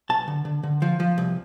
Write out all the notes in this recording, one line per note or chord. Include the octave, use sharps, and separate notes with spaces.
B1 A5
D3
D3
D3
F3
F3
C2